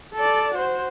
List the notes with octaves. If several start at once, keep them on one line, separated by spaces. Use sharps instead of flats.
A4 D5
F#4 C5